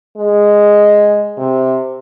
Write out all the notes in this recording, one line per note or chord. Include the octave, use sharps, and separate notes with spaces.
G#3
C3